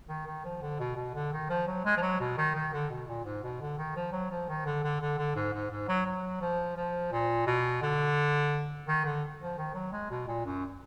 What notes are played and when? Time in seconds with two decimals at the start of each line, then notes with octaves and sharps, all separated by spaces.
0.08 D#3
0.27 D#3
0.45 F3
0.62 D3
0.79 B2
0.96 B2
1.14 D3
1.32 D#3
1.50 F3
1.67 F#3
1.85 G#3
1.97 F3
2.02 F#3
2.20 B2
2.38 D#3
2.55 D#3
2.73 D3
2.90 B2
3.08 A#2
3.25 G#2
3.43 B2
3.61 D3
3.78 D#3
3.96 F3
4.12 F#3
4.31 F3
4.48 D#3
4.65 D3
4.83 D3
5.01 D3
5.18 D3
5.35 G#2
5.53 G#2
5.71 G#2
5.88 F#3
6.06 F#3
6.41 F3
6.76 F3
7.11 A#2
7.46 B2
7.82 D3
8.87 D#3
9.05 D3
9.40 F3
9.58 D#3
9.74 F#3
9.92 G#3
10.11 B2
10.28 A#2
10.45 F#2